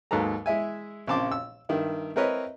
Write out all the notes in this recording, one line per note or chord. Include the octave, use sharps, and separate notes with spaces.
D#2 G#2 F#3 A4 B4 A#5
G#3 E4 E5 G#5
A#1 C#3 C4 A5 C6 D6
E6
G2 D#3 E4
C4 E4 A#4 B4 C#5 D#5